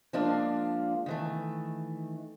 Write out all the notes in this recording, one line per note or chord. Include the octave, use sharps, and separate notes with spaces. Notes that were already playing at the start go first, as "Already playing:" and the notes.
F3 G#3 A#3 D4 F4
D#3 E3 A3